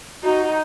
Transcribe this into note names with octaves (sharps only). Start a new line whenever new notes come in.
D#4 F#4